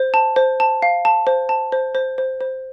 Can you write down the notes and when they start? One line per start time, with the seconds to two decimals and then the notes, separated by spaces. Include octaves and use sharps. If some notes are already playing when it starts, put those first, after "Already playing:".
Already playing: C5
0.14 A5
0.36 C5
0.60 A5
0.82 F5
1.05 A5
1.27 C5
1.49 A5
1.72 C5
1.95 C5
2.18 C5
2.41 C5